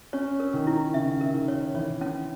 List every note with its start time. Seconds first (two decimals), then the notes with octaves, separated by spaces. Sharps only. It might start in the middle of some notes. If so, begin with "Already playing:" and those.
0.13 C#4 C#5
0.40 A#4
0.54 D#3
0.67 E4
0.94 C#3 E5
1.21 A#4
1.34 D#3
1.48 C#5
1.75 E3 C#5
2.01 C#4